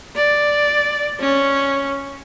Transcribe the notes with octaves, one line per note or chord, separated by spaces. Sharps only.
D5
C#4